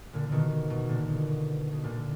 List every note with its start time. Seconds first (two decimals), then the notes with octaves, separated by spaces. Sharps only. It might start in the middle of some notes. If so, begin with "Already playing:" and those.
0.13 A#2 D3
0.28 B2 D3 D#3
0.51 B2
0.70 B2
0.89 A#2 D3
1.08 B2
1.27 B2
1.72 B2
1.84 A#2 D3